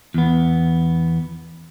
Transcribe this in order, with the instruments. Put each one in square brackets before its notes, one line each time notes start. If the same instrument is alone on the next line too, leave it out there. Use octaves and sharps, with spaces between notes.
[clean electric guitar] E2 B3